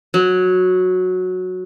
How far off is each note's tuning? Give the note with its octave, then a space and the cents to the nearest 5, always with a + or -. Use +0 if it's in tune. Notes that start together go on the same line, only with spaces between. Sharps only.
F#3 -10